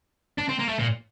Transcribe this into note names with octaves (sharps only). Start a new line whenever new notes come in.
D4
C4
A#3
A3
A#2